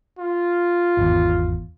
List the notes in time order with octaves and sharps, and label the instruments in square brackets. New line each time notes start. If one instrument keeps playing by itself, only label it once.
[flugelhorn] F4
[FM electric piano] G#1 E2